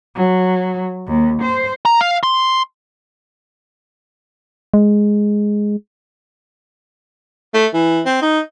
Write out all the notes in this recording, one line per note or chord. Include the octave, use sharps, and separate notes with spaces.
F#3
D#2
C5
A#5
F5
C6
G#3
A3
E3
C4
D#4